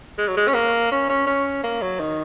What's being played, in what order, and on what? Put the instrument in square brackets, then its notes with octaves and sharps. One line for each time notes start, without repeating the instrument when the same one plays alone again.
[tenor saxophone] G#3
F#3
G#3
C#4
A#3
C#4
C#4
C#4
A#3
F#3
D#3